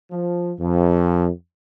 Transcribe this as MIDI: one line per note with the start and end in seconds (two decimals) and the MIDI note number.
0.10 0.52 53
0.59 1.29 41